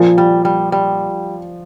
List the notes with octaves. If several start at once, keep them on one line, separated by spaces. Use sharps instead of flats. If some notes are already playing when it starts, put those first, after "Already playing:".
Already playing: A#2 F3
G3
G3
G3